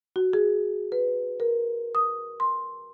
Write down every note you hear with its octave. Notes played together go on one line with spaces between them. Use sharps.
F#4
G#4
B4
A#4
D#6
C6